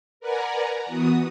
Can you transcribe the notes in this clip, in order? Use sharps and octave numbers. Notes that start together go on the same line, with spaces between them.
A#4 B4 D5 F#5 G#5 A#5
E3 B3 F#4 D#6